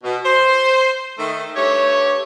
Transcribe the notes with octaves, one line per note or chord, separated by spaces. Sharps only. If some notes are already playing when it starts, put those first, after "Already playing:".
B2
C5
D#3 A3
G2 A3 G4 C#5